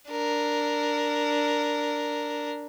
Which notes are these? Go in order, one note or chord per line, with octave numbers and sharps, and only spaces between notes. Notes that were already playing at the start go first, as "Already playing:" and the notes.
D4 A#4